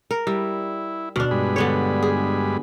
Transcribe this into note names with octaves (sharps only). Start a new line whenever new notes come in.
A#4
G3 E4
D2 B2 D4 F6
G2 G#3 B5
D3 B3 C#5
G#4